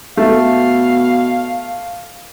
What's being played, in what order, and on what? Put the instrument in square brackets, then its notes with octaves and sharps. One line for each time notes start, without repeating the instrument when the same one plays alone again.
[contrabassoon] B2 [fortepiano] A3 [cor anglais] F5